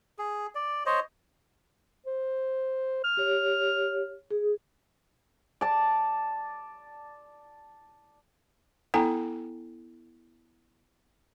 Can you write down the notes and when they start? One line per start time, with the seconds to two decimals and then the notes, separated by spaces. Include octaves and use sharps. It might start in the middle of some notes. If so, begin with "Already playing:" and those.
0.19 G#4
0.55 D5
0.86 C5 C#5 D#5
2.07 C5
3.04 F6
3.17 G4 C#5
4.31 G#4
5.61 D5 A5
8.94 B3 E4 A4 G5 G#5 A#5